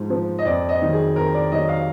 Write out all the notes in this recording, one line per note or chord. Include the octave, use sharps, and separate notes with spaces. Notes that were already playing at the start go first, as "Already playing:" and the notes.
Already playing: G#2 F3
F3
D#5
F2 D5
D#5
D#3 F#3
G#4
F2 A#4
D5
D#3 F#3 D#5
F5